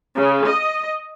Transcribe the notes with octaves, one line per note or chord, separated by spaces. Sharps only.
C#3
D#5